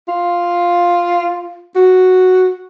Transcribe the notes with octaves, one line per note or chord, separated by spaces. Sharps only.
F4
F#4